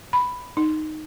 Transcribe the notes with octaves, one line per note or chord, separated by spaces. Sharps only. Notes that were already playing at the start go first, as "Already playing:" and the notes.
B5
D#4